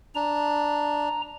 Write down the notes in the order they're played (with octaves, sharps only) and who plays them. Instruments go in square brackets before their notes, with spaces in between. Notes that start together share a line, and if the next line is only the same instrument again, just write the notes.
[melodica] D4 [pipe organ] A#5